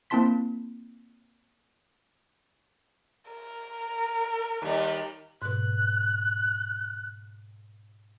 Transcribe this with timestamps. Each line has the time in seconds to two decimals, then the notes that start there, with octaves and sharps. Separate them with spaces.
0.10 A#3 C4 E4 A5 C6 B6
3.29 A#4
4.62 D#2 G3
5.42 G#2 B2 F#6